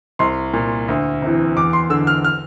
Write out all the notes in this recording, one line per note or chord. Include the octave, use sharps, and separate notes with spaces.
C2 C6
A#2
D2
C3 E3
E2 D6
C6
D3 E6
F6
F6